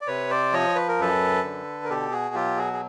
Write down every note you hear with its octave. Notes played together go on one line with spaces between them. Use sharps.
D5
C3 B4 C#5
C5 D5
F3 C#5 D#5
B4
A#4
F#2 A4 B4
D3
A#4
B2 G4 A4
F#4 G#4
F#3 F4 G4
F#4 G#4
G#4